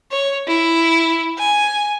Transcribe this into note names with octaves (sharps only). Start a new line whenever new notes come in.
C#5
E4
G#5